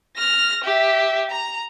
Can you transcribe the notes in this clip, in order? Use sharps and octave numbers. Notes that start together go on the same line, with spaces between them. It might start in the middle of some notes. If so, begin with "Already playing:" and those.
F6 A#6
G4 E5
A#5